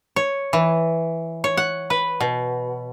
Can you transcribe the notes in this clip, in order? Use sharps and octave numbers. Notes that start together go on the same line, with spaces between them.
C#5
E3
C#5
F#5
B4
B2